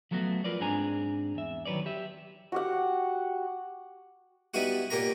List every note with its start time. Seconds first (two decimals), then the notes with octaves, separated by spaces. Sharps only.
0.11 F3 F#3 A3 B3 F#4
0.44 F4 A#4 B4 D5
0.60 G#2 C4 D4 G#4 G#5 A#5
1.35 E2 E5
1.65 D#3 F#3 B4 C#5 D5
1.86 G4 E5
2.52 F#4 G4 F#5
4.54 G3 B3 D#4 E4 F#4 F#5
4.90 A#2 G4 A#4 C#5 A#5